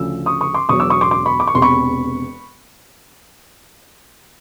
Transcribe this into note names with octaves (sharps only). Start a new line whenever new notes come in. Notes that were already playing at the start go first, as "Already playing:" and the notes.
Already playing: D2 C#3 F3 E6
C#6 D#6
C#6 D#6
C6 D6
E1 E2 B2 F#3 C#6 D#6
D6 E6
C#6 D#6
C6 D6
C6 D6
B5 C#6
D6
C#6
E1 E2 C3 C6
B5 C#6